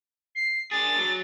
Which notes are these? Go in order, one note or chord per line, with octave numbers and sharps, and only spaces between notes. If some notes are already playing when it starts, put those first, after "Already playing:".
C7
D4 G#4 A6
F#3